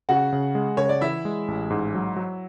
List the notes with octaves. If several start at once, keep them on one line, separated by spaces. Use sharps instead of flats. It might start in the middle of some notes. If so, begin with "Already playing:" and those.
C#3 F#4 F#5
C#3
G#3
C#3 C#5
D5
E3 E4 E5
G#3
A1
G#2
F#3
F#3